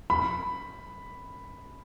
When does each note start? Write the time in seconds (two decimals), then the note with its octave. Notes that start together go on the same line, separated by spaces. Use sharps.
0.10 B5